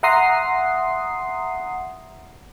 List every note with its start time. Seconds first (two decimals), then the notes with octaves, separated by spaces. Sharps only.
0.03 E5 F#5 A#5 C6 D#6 C7